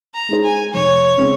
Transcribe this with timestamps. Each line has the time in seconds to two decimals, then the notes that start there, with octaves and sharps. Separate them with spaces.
0.14 A#5
0.29 G#3 D#4 G#4 C5
0.44 G#5
0.73 F1 C#5
1.17 C#3 G#3 C4